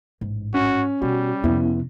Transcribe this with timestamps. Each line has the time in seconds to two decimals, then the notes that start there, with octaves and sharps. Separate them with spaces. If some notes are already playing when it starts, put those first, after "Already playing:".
0.21 A1 G#2
0.54 C#4 F#4
1.02 B2 G3 F#4
1.44 F2 C3 B3 E4